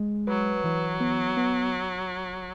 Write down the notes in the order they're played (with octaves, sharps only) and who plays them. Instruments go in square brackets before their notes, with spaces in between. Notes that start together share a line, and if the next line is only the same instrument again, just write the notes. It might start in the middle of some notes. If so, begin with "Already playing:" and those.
Already playing: [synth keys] G#3
[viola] F#3 [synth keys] B4
[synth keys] E3
B3
B3